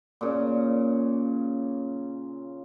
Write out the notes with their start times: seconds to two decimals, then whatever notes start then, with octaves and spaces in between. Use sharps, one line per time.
0.21 A#2 C#3